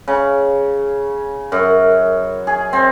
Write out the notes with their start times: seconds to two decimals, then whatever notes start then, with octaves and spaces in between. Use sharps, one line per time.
0.08 C#3
1.52 F#2
2.47 G#4
2.73 C4